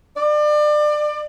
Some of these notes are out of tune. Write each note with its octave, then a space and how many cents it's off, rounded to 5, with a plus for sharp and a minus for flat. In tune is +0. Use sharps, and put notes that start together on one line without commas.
D5 +30